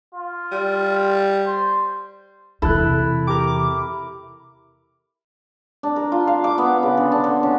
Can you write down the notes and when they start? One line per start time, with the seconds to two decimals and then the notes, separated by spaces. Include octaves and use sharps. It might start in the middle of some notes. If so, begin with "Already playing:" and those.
0.15 F4
0.52 G3
1.47 C5
2.62 E2 C3 E4 A4 F#6
3.27 G4 A#4 D6
5.83 D4
5.96 A#4
6.12 F4
6.27 F5
6.44 D6
6.58 B3
6.83 C#3
6.97 D3
7.12 D4
7.24 D3
7.43 C#4